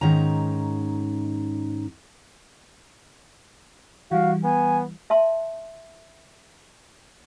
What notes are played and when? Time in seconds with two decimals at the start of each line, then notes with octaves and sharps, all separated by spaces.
0.01 G#2 D#3 C#4 A#5
4.11 E3 G3 F#4 F5
4.44 B3 G#5
5.10 E5 A5 C6